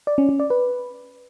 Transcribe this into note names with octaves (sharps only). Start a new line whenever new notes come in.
D5
C#4
C#4
D5
B4